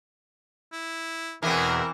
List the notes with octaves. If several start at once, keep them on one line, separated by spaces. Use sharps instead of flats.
E4
E2 B2 E3 C4 G#4 A#4